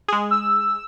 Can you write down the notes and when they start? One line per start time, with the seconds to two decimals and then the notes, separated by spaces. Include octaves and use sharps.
0.08 G#3 G#4
0.31 E6